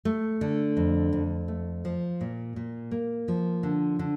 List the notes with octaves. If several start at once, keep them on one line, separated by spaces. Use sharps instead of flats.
A3
D3
F2
F2
A3
F3
A#2
A#2
A#3
F3
D3
D3